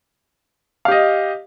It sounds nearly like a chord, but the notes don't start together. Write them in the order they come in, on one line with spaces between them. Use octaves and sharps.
F5 G4 D#5